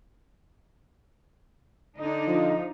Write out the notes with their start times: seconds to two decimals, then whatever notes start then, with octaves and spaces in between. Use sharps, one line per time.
1.98 D3 D4 D#4 D#5
2.28 F3